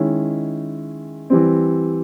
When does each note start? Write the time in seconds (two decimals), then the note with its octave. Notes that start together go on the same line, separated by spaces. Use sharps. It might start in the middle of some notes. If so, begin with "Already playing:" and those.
Already playing: D#3 G#3 C#4 E4
1.30 E3 G3 C4